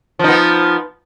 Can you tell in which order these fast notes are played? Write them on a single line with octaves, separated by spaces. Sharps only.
F3 D#4 B3